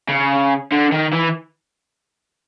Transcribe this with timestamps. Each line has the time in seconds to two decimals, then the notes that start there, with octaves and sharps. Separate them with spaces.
0.09 C#3
0.72 D3
0.92 D#3
1.13 E3